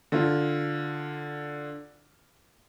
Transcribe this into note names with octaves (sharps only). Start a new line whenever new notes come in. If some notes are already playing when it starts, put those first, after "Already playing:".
D3 F4